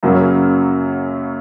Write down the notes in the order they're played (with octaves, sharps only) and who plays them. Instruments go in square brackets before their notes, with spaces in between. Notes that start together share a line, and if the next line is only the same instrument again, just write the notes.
[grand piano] F#2 C#3 F#3 A#3